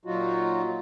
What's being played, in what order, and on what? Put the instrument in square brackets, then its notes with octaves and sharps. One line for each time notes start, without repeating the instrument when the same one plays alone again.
[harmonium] A#2 F#3 D#4 F4 F#4